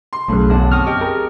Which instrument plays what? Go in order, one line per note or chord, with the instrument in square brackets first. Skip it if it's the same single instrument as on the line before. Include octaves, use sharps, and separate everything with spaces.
[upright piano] C6
[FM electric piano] B1 F#2 [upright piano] A2 C#3
[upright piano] E2 D3 [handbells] C#5 F5 A5
[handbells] C4 C#6 D#6 [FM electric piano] F6
[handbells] G4 D#5 [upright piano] G5
[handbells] G#4 [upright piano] A#4